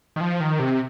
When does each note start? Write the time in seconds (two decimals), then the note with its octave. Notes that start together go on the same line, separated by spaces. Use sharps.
0.16 D#3
0.21 F3
0.40 D#3
0.59 C3